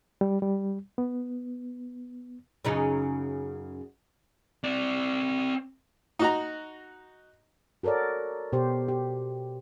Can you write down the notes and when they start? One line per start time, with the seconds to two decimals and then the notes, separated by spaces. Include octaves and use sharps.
0.21 G3
0.42 G3
0.98 B3
2.65 F#2 C#3 D#4
4.64 C4 D5
6.19 D#4 F#4 A#5
7.83 F#4 A4 A#4 C#5 D5
8.53 B2 G4 C5
8.88 G4